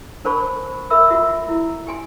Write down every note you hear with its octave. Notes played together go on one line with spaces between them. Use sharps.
D4 A#4 C5 A5 B5 C#6
A#4 E5 B5 E6
F4 F#4 E5
E4
G4 G#5 C6